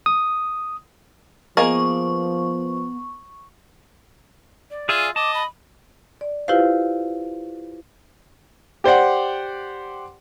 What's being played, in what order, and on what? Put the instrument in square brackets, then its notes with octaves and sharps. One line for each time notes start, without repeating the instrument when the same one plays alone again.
[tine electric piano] D#6
[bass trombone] F3 [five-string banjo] A#3 G#4 D#5 [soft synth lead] B3 [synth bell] C#6
[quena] D5
[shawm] F4 [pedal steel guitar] G#4 E5 G#5
[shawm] D#5 [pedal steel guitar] A5 [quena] D6
[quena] B5
[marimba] D5
E4 F4 G4 B4 C5 F5
[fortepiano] G4 C5 D5 F#5